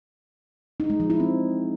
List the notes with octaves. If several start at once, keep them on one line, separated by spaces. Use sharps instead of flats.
D#4
G#3
F3
E4
C4